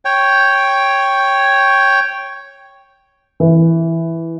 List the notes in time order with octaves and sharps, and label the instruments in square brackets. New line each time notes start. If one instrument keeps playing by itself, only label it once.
[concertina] C#5 G5
[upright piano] E3